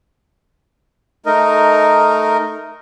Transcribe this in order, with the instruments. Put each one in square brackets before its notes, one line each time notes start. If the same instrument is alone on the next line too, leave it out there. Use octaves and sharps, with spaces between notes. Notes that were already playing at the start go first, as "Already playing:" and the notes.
[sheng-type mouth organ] A3 D#4 A#4 D#5